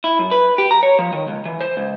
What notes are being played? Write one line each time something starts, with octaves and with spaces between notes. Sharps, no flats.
E4
F#2
B4
G4
A#5
C#5
F3
D#3
C#2
E3
C5
C#2